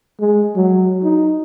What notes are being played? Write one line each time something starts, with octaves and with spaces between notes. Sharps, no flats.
G#3
F#3
D#4